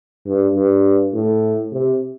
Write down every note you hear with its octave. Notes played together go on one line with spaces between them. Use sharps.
G2
G2
A2
C3